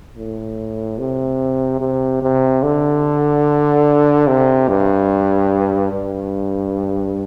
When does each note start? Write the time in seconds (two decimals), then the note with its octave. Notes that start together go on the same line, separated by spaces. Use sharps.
0.18 A2
0.99 C3
1.81 C3
2.22 C3
2.63 D3
4.27 C3
4.68 G2
5.91 G2